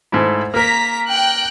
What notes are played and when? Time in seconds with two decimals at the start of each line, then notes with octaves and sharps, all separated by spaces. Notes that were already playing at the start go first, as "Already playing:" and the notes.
0.12 G#2 A3 E4
0.54 A#3 A#4 A#5 B6
1.08 G5 F#6